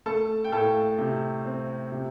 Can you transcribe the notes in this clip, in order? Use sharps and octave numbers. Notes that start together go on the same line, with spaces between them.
A3 A4 A5
G5
A2 A4 A5
C3
C4
C3